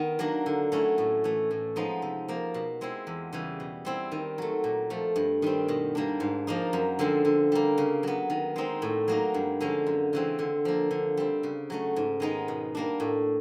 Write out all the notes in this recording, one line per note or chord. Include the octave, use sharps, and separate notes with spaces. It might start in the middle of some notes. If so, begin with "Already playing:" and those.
Already playing: D#3 B3
F#3 A#3 D4
D3
F#3 A3 C#4 E4
A2
E3 A3
A2
F3 G#3 B3 D#4
C3
F3 A#3
B2
G#3 C4 E4
E2
C#3 E3 G3
B2
G3 C4 E4
D#3
F#3 A3
A#2
F3 A3
G2
D#3 G3 C4
B2
G3 A#3 D4
G#2
F3 A#3 D#4
F#2
D3 F3 G#3 C4
D3
G3 A#3
C#3
F#3 B3
D#3
G#3 C4 D#4
A2
F#3 A#3 D#4
G2
D3 F3 G#3 C#4
F#2
C#3 E3 G#3 C4
D3
F3 A#3
D3
G3 C4
C#3
F#3 A3 C#4
G#2
D#3 G#3 B3 D#4
B2
G3 A#3 D4
A2